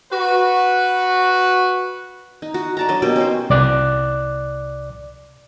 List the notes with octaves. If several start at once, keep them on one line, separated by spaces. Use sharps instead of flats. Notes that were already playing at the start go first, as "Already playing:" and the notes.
F#4 B4
D#4
F#4
D5 A5 A#5
F#3 D4 D#5 A5
B2 A#3 F#4 G4
C#4 D#4 C5
C2 D5 D6 F#6